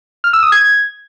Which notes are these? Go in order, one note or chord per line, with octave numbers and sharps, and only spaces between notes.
F6
E6
D#6
G#6